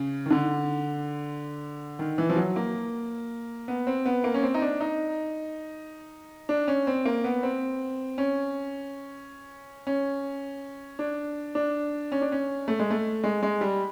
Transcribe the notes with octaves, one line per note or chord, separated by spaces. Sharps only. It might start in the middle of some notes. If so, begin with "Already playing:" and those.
Already playing: C#3
D#3
D3
D#3
E3
F3
F#3
A#3
B3
C4
B3
A#3
C#4
C4
D#4
D4
D#4
D4
C#4
C4
A#3
B3
C4
C#4
C#4
D4
D4
C#4
D4
C#4
A3
G#3
A3
G#3
G#3
G3